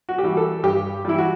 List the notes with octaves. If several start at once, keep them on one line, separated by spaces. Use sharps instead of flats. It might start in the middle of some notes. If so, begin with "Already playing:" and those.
F#4
G4
E3 G3 F#4
A4
G2 G4
E3 G3 E4
F#4